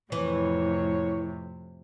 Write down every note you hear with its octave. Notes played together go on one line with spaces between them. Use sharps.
F2 A2 C3 E3 C#5